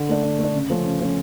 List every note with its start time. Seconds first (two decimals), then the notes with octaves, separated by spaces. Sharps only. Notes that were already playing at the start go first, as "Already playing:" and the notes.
Already playing: D3
0.09 A3 D4
0.23 D3
0.39 A3 D4
0.55 C#3
0.70 F3 A3 C#4
0.85 C#3
1.01 F3 A3 C#4